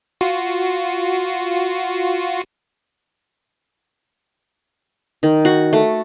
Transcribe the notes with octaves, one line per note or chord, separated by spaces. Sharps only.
F4 F#4
D#3
F#4
A3